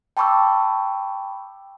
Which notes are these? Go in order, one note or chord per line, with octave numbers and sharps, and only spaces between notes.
G5 A5 B5 C#6 D6 E6